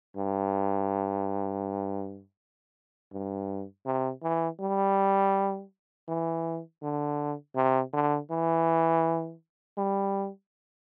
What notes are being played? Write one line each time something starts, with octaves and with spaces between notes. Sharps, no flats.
G2
G2
C3
E3
G3
E3
D3
C3
D3
E3
G3